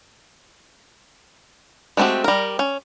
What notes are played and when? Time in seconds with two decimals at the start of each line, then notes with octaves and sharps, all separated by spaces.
1.97 G#3 A3 C4 F#4 G4
2.24 G3 A#4
2.59 C#4